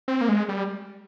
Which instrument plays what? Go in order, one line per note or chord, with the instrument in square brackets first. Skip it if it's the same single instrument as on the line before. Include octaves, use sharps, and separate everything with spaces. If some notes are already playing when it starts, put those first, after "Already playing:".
[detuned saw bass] C4
A#3
G#3
G3